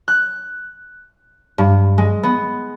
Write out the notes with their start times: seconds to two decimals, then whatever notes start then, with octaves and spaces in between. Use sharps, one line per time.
0.08 F#6
1.58 G2
1.98 G#3
2.23 B3